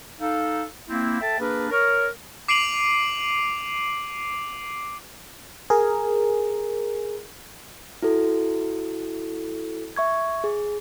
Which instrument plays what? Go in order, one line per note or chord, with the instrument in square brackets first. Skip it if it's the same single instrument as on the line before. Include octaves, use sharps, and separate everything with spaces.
[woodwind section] D#4 A4 F5
A#3 C4 E4
A4 E5 G5 A5
A#3 D4 G#4 A#4 B4
A#4 C#5
[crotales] D6 C7 D7 D#7 F7 F#7
[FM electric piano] G#4 A#4
[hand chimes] E4 F#4 A4
E5 C#6 G#6
G#4